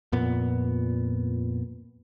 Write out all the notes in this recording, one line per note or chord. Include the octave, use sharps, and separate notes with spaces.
F2 A#2 B3